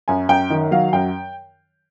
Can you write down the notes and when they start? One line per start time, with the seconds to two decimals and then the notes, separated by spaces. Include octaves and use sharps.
0.08 F#2 G#5
0.29 F#2 G5
0.50 D#3
0.71 F#3 F5
0.93 F#2 G5